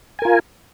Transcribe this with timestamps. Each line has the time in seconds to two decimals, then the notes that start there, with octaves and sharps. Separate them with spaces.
0.19 G#5
0.22 A#4
0.25 F4